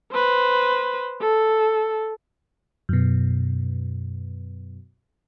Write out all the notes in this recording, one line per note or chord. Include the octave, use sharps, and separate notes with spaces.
B4 C5
A4
F#2 B2